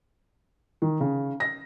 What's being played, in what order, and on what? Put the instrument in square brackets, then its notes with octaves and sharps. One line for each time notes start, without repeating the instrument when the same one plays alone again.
[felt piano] D#3
C#3
A#6